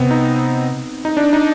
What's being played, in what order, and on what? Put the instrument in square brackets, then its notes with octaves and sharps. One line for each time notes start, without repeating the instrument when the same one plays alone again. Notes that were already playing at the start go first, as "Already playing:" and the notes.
Already playing: [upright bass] C3 [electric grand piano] B3 C4
[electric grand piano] D#4
D#4
D4
D#4